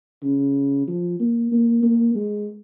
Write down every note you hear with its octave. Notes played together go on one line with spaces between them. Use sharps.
C#3
F3
A#3
A#3
A#3
G#3